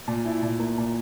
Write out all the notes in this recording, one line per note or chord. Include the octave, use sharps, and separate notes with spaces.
A#2
E4
A#2
A#3
A#2